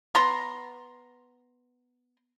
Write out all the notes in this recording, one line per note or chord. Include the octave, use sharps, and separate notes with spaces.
B3 A#5 C6